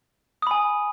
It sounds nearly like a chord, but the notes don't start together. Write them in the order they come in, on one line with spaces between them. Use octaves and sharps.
D#6 B5 G#5